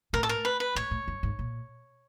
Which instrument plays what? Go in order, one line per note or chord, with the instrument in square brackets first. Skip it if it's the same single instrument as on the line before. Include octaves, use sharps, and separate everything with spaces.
[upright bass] A2 [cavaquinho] A#4
[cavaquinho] A4
A#4
B4
B4
[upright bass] A2 [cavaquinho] C#5
[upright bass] A2
G2
G#2
A#2